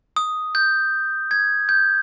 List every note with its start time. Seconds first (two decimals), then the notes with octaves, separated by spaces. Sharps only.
0.16 D#6
0.55 G6
1.31 G#6
1.69 G6